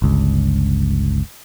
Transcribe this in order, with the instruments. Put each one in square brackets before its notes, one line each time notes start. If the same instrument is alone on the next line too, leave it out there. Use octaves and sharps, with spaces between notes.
[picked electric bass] G1 C#2